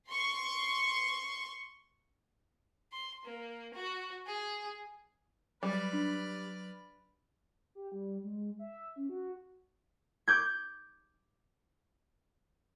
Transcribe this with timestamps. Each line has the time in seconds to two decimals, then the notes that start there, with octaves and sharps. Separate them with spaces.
0.10 C6 C#6
2.92 C6
3.25 A#3
3.74 F#4
4.27 G#4
5.63 F#3 G3 B4 D5 F6
5.93 D4
7.75 G4
7.92 G3
8.23 G#3
8.59 E5
8.96 C#4
9.09 F#4
10.28 D6 G6 G#6